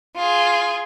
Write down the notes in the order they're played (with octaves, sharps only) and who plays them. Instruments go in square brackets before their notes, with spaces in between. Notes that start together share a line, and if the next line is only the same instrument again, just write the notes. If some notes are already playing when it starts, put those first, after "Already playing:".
[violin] F4 G#4